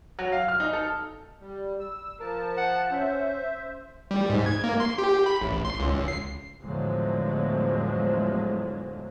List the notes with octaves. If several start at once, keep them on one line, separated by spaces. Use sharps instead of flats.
F#3
F5
F6
D#4
A4
G3
E6
F3 A#4 A5
F#5
C#4 C5 E5
G3
G#2
G#6
A#3
C6
G4
B5
A1
C6
C#2
C7
E2 A2 D3 F3 F#3 G#3